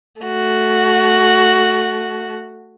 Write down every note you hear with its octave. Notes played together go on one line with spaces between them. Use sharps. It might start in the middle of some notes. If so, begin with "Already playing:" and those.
A3 F#4